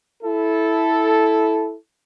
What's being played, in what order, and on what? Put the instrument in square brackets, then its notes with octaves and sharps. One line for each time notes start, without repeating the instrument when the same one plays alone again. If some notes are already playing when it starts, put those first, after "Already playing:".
[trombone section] E4 A4